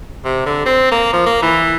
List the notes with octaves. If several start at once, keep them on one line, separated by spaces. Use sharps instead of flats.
C3
D3
C4
A#3
F3
A#3
E3